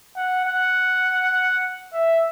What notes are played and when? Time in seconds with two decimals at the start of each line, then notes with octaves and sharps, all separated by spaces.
0.16 F#5
0.46 F#5
1.93 E5